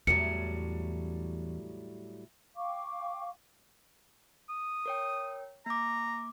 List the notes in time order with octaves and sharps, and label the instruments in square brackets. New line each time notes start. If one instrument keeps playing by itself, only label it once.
[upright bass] E2 [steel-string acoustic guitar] A2 F#3 G3 [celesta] C#7
[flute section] F5 G5 C#6 D6
[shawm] D#6
[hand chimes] A#4 C#5 G5
[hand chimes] A#3 D6 [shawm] A#5